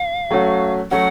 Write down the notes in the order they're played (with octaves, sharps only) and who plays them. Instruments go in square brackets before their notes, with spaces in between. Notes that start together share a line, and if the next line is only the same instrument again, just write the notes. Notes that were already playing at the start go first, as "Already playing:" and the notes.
Already playing: [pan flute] F5
[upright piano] F#3 A3 C#4 F#4
[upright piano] F#3 A3 C#4 F#4 [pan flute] F#5